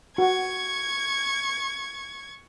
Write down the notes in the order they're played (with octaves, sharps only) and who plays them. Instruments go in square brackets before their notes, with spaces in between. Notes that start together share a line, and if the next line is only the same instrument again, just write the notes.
[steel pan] F#4 [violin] C#6 G#6